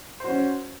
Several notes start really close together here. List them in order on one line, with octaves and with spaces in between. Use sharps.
C5 F#4 C#4